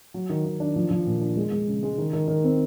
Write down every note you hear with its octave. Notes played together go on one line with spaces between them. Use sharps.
F#3
D#3
D#3
D4
F3
F3
A#2
D4
G#3
G#3
C#3
G#3
D#3
D#3
D#3
C4